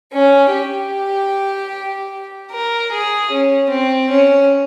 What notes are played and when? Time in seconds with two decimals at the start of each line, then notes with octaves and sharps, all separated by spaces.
0.13 C#4
0.53 G4
2.51 A#4
2.91 G#4
3.30 C#4
3.70 C4
4.10 C#4